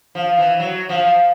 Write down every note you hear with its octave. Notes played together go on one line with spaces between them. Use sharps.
F3
E3
F#3
F3